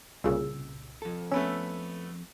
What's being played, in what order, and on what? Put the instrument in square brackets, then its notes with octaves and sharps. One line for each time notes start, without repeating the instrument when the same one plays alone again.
[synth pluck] C2 A#2 C#3 [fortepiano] E6
[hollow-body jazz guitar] F2 A4
[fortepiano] A3 B3 E6 [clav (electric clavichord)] C#4